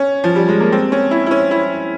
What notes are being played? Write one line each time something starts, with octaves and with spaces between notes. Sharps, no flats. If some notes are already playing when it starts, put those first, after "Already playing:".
Already playing: C#4
F3
G3
G#3
A#3
C4
C#4
E4
E4
C#4
E4